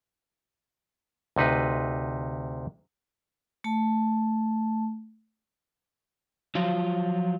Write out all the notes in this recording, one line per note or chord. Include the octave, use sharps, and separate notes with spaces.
D2 C3 D#4 B4
A3 A5
F3 F#3 F4